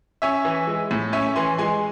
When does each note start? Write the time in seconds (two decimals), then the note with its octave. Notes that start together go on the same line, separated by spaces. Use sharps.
0.22 C#4 E5 G#5
0.45 E3
0.67 G#3
0.91 A2
1.13 C#4 E5 G#5
1.35 E3 G#5 C6
1.58 G#3 G#5 C6